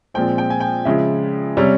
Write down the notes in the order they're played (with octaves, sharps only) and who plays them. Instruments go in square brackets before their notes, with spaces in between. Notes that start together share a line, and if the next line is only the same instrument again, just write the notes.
[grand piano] A#2 F3 G#3 C4 G5
G5
G#5
G5
C#3 F3 G#3 E5
C3 G3 C#4